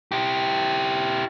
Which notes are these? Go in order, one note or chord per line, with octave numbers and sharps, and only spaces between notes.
E4 G4